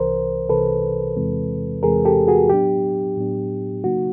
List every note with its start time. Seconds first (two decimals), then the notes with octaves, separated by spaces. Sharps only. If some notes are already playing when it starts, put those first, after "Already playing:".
Already playing: C2 C3 E3 A#4 C5
0.49 C2 C3 E3 A4 B4
1.16 E2 C3 E3 G#3 C4
1.83 E2 C3 E3 G#3 C4 G#4 A#4
2.05 G4 A4
2.28 F#4 G#4
2.49 A2 F#3 B3 D4 G4
3.17 A2 F#3 B3 D4
3.83 C#3 F#3 A#3 D#4 F#4